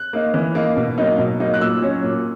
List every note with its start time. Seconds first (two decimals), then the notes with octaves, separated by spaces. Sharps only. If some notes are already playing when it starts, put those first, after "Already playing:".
Already playing: F#6
0.13 A#3 D#4
0.34 E3
0.55 A#3 D#4
0.77 B2
0.98 F#3 A#3 D#4
1.18 B2
1.40 F#3 A#3 D#4
1.54 F#6
1.61 A#2 E6
1.82 F#3 C#4
2.04 A#2